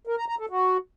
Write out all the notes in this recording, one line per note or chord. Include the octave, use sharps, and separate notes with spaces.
A#4
A#5
A#5
A4
F#4